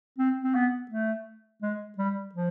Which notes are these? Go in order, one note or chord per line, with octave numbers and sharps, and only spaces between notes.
C4
C4
B3
A3
G#3
G3
F3